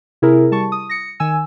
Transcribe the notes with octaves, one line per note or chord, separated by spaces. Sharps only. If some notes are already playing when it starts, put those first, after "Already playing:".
C3 E4 G#4 A#4
G3 A5 C#6
D#6
A#6 C#7
D#3 G#5 E6